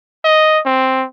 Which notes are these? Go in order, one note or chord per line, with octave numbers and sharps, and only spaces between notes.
D#5
C4